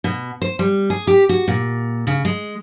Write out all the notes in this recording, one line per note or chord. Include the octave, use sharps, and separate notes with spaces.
B2
C5
G3
G#4
G4
F#4
A#2
C#3
G#3